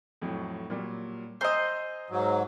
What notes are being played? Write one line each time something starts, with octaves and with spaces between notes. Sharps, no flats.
F2 A2 F#3
A#2 F#3 G3
C5 D#5 G#5 A#5 E6
G#2 F#3